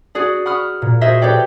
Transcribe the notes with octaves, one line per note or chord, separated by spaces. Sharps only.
F#4 G#4 D5
F#5 B5 C#6 D#6 F6
A#2
F#4 G#4 C5 D#5 E5
G4 A4 B4 C#5 D5 G5